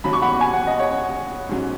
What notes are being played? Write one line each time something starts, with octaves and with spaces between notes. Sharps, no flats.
D#2 C#3 F#3 B5
C#6
F#5 B5
G#5
F#5
D#5
C#5 F#5
G#2 F#3 C#4